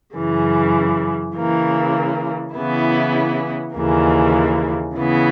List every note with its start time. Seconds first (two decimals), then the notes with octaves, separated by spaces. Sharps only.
0.15 F#2 C#3 E3
1.35 C#3 E3 A#3
2.55 C#3 E3 B3 E4
3.75 D#2 C#3 E3 A#3
4.95 C#3 E3 B3 E4